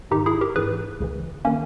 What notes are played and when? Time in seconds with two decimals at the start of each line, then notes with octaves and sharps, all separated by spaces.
0.11 G#2 D#3 D#4 G4
0.26 E4 G#4
0.41 G4 A#4
0.56 G#2 E3 G#4 B4
1.00 C#2 C#3 E3
1.45 D#3 A#3 C#4